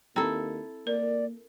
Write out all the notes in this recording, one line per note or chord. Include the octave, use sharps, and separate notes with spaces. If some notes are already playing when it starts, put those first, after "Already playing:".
D#2 C4 E4 A4 G5 A#5
A#3 A#4 D5